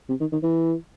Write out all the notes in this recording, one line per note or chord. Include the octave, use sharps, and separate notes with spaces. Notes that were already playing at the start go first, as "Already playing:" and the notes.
C3
D#3
D#3
E3